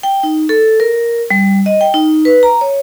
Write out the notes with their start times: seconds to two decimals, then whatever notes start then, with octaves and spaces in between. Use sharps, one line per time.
0.03 G5
0.23 D#4
0.49 A4
0.80 A#4
1.30 G3
1.66 D#5
1.81 G5
1.94 D#4
2.25 B4
2.43 A#5
2.61 C#5